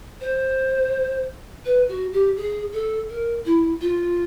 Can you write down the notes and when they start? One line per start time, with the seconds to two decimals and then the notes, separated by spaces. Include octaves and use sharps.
0.21 C5
1.65 B4
1.89 F#4
2.13 G4
2.37 G#4
2.73 A4
3.09 A#4
3.45 E4
3.81 F4